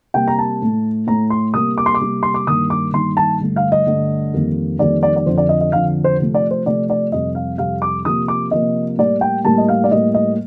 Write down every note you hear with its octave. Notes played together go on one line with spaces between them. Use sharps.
C3 G3 A#3 G5
A#5
A5
A2 A3
A2 A3 A#5
C6
C3 G3 A#3 D#6
D6
C6
D6
C3 G3 A#3
C6
D6
G2 D#3 A#3 D#6
D6
G2 D#3 A#3 C6
A5
G2 D3 A3
F5
D#5
G2 D3 A3
F2 D#3 G3 A#3
F2 D#3 G3 A#3 D5
D5
D5
F2 D3 F3 C5
D5
D#5
D#5
F2 D3 F3 F5
C5
C3 F3 A3
D5
C5
C3 F3 A3 D5
D5
F2 C3 G3 D#5
F5
F2 C3 G3 F5
D6
C3 F3 A#3 D#6
D6
C3 F3 A#3 D#5
A2 G3 A#3 D5
G5
A2 G3 A#3 A5
D#5
F5
D5
A2 G3 A#3 D#5
D#5